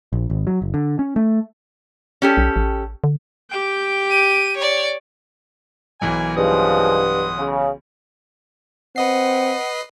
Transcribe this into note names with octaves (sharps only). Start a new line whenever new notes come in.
A#1
G#1
F#3
F#1
D3
C#4
A3
C#4 G4 A4
B1
A1
D3
G4 G5
D#7
C#5 D5
B1 E3 A#3 G#5
G2 C#3 F3 G#3 F#5 C6 D#6
C#3
C4 B4 D#5 F#5 C7